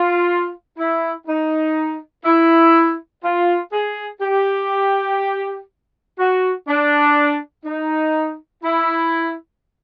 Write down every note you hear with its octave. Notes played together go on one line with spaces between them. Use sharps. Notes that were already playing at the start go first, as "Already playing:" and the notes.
Already playing: F4
E4
D#4
E4
F4
G#4
G4
F#4
D4
D#4
E4